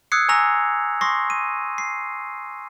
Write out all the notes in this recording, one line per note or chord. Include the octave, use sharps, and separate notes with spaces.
D#6 E6 F#6 G#6 C7 C#7
G#5 A#5 C#6 E6 A#6 F7
C6 C#6 D#6 A#6 C7
D#7
C7